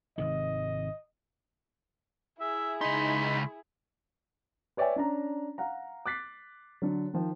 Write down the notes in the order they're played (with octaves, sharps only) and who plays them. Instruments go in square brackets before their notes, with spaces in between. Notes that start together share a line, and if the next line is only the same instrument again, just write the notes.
[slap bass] G#1 C3 D#3 [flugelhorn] D#5
[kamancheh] E4 G#4 [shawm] E5
[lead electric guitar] C#2 C6 [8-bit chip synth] D#4 [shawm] B5
[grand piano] B4 C#5 D5 E5 G5 G#5
C#4 D4 A#5
F5 F#5 A#5
D6 F#6 A6 B6 C7
D3 F#3
D#3 F3